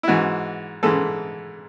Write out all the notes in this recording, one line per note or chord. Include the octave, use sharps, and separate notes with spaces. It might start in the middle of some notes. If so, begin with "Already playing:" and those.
E4
G#2 E3 G#3 F#4
G#2 E3 G#3 A4